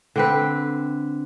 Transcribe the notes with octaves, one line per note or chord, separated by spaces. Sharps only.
D3 C4 B4